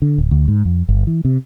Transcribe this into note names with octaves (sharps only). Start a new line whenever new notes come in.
D3
D1
D2
G#2
F2
G1
E3
C3